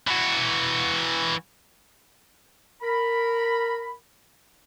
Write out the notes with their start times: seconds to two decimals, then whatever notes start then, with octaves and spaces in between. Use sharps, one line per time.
0.07 E3 F#4
2.83 A#4 B5